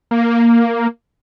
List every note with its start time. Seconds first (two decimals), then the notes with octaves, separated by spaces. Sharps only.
0.11 A#3